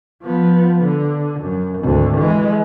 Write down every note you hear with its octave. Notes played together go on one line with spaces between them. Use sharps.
F3 B3
D3
F#2
G#1 D2
E3 G#3